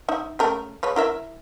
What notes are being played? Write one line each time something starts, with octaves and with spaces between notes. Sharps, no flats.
D#4 E5
C#3 A3 A#4
G#3 B4 C#5
E4 A#4 E5